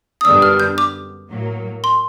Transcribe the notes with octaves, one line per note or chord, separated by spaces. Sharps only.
D#6
F#2 D3 G3 B3 D4 E6
F6
G6
D6
A2 F#3 A#3
C6